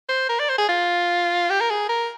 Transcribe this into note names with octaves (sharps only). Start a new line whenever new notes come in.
C5
A#4
D5
C5
G#4
F4
G4
A#4
G#4
A#4